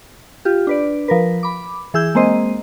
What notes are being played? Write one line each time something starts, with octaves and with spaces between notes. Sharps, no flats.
F4 G4
D4 B4 D5
F3 A#4 B4
B5 D6
E3 G#4 E6 G6
G#3 A#3 C4 C5 D#5